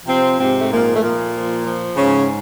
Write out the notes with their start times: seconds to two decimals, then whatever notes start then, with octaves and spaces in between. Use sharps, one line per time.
0.06 C3 F3 C4
0.38 G#2 C3 C4
0.59 A3
0.70 A#2 F3 A#3
0.93 A3
1.01 A#2 F3 A#3
1.33 F3
1.64 F3
1.96 G#2 C#3 C#4